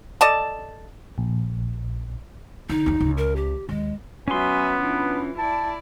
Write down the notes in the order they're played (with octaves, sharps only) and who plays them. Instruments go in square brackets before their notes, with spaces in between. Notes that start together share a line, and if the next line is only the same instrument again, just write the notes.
[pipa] A4 D5 D#5 A5
[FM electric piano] A#1
[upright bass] D3 [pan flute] D#4
[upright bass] D#2 D4
C#2 C#3
[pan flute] A#4
G4
[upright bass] D#2 [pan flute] G#3
[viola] F#3 E5 [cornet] B3 [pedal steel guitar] C#4 C6 [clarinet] G#5
[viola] E3 F4 [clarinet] D4
[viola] E4 D5 [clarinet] A5